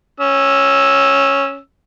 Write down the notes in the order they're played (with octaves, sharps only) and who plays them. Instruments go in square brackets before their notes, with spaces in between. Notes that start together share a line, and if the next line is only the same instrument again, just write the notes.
[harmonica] C#4 E6